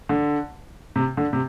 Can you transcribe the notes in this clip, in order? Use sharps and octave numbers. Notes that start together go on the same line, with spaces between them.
D3
C3
D3
C3